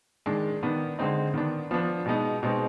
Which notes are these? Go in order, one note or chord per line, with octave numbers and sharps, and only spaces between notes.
D#3 G#3 D4
D#3 B3 D4
D3 G#3 C4 D#4
D#3 B3 D4
F3 B3 D4
B2 G#3 B3 D#4
B2 G#3 C4 D#4